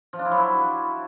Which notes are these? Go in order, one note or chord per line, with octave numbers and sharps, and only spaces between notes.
F3
D4
E4
F#3
E4